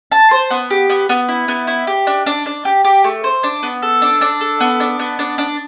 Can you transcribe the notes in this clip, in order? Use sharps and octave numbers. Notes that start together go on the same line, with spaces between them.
A5
C5
B3
G4
B3
B3
E4
B3
E4
G4
D4
D4
D4
G4
G4
A3
C5
D4
B3
A4
D4
D4
A4
B3
D4
B3
D4
D4